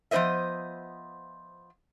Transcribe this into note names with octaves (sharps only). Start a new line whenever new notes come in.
F3 B3 C#4 C5 D#5 E5